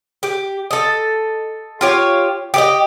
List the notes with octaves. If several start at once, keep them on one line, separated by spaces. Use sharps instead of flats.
G4
A4 D#5
F4 G4 C#5
G4 G#4 D#5